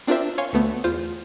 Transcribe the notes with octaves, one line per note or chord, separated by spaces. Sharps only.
C4 D4 F4 A#4 C5 E5
C#5 F5 G#5 C6
D2 A3 B3
E2 F4 C5 G6